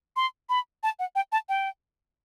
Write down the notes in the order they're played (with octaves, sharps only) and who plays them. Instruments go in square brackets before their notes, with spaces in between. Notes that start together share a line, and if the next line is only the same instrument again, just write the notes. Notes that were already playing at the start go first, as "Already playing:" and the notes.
[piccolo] C6
B5
A5
F#5
G5
A5
G5